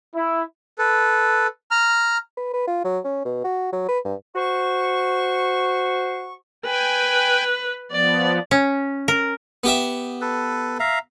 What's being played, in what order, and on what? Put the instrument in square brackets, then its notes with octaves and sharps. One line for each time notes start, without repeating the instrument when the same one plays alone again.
[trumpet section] E4
[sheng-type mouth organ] A4 B4
A#5 F6
[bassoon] B4
B4
F4
F#3
C#4
B2
F#4
F#3
B4
G2
[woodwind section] F#4 C5 C#6
[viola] B4 [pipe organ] G5 G#5
[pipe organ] F3 B3 [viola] D5
[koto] C#4
A#4
[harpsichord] B3 G4 E5
[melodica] A4 B4
E5 F5 A#5